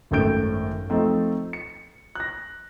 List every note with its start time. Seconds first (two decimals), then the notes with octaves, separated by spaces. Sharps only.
0.11 G#1 F#2 A3 G5 G6 D7
0.90 F3 A3 C4 D#4
1.53 C#7
2.15 F#6 A#6